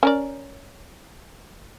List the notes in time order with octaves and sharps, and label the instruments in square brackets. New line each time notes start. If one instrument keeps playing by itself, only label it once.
[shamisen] C#4 A#4 D5